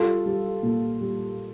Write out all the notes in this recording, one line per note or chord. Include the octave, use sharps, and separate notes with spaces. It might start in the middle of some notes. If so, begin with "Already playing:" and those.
Already playing: G3 F4 A4
G3
A#2
G3